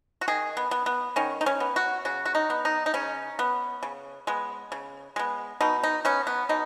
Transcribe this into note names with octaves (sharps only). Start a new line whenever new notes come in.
F#4
D#3 G#4
B3
B3
B3
D#3 C#4
D#4
C#4
B3
F#4
C#3 F#4
F#4
D#4
B3
D#4
D#4
C#3 C#4
B3
C#3
G#3 B3
C#3
G#3 B3
B2 D#4
D#4
B3 C#4
B3
B2 D#4